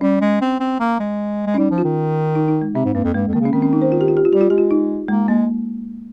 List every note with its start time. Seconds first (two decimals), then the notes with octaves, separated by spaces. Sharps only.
0.01 G3 C#4
0.21 G#3
0.41 C4
0.60 C4
0.80 A#3
0.99 G#3
1.47 G#3
1.54 C#4
1.58 G3 D#4
1.71 F3
1.78 F4
1.84 D#3
2.35 D#4
2.48 D#4
2.62 G#3
2.75 C3 C4
2.85 G#2
2.94 G2 A#3
3.04 F2
3.14 G2 G#3
3.28 F2
3.33 D#3 A#3
3.40 C#3
3.45 C#4
3.52 D#3 C4
3.62 C#4
3.73 D#4
3.82 C5
3.92 F4
4.01 G4
4.08 F4
4.17 G4
4.25 F4
4.32 G3 G4
4.41 F4
4.50 G#3 G4
4.58 F4
4.71 D#4
5.08 G#3 A#3
5.28 G#3 A#3